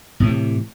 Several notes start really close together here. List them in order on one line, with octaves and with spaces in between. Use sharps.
A2 E3 C3